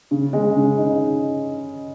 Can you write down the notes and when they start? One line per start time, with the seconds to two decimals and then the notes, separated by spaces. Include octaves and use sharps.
0.11 C#3
0.33 G#3
0.56 C#3
0.78 D#4